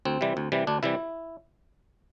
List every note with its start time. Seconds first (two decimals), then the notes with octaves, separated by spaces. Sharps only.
0.05 D2 C4
0.21 C3 E3 G3
0.37 D2
0.52 C3 E3 G3
0.67 D2 D4
0.83 C3 E3 G3 E4